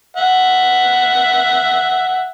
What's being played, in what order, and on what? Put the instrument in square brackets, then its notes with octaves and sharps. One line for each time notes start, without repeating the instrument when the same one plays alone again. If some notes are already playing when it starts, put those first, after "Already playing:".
[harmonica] E5 F#5